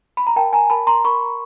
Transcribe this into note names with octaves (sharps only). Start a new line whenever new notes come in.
B5
A#5
A#4 G5 A5
G#5 A#5
A#4 A5 B5
A#5 C6
A#4 B5 C#6